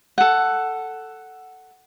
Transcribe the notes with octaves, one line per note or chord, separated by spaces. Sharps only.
A4 F#5